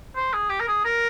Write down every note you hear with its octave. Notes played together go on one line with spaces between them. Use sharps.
C5
G#4
G4
A#4
G#4
A#4